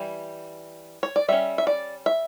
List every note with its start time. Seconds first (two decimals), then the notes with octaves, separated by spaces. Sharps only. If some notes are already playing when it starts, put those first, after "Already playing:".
Already playing: E3 G3
1.03 C#5
1.16 D5
1.28 G3 C#4 E5
1.58 E5
1.67 D5
2.06 E5